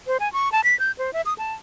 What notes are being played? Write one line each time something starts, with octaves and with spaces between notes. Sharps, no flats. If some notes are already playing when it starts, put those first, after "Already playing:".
C5
G#5
C#6
A5
B6
G6
C5
E5
D#6
A5